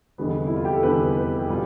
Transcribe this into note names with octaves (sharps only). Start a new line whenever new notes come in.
F1 E2 D3 G3 B3
E4
F4
G4
A4
F1 E2 D3 G3 B3 B4
B4
G4
B2 G3 F4